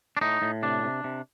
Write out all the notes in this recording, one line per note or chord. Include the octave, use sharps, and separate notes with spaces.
D4
A2 D#4
A2
C3 D4
C3
C3